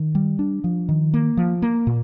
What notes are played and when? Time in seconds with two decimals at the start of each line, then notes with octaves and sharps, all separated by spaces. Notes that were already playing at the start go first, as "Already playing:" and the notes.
Already playing: D#3
0.15 G3
0.39 D4
0.64 F3
0.89 D#3
1.14 A#3
1.37 F3
1.62 A#3
1.87 A#2